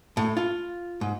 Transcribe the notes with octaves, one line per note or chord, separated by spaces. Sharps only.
A2
F4
G#2